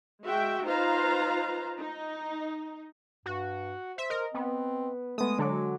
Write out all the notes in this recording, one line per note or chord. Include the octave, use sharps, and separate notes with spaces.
G#3 F#4 E5 G5
D#4 F4 B4 C5 F5 A#5
D#4
G2 F#4
C5 E5
A#4 D#5
B3 C4
G#3 A3 B3 D#6
D3 F#3 A4 D6